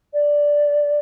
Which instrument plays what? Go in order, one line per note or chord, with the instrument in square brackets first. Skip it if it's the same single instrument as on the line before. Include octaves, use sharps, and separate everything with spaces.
[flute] D5